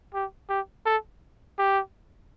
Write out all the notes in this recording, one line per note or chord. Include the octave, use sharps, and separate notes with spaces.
G4
G4
A4
G4